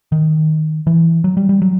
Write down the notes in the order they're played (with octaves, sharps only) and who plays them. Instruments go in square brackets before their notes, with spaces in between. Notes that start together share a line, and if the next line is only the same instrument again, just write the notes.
[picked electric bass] D#3
E3
F#3
G3
G3
F#3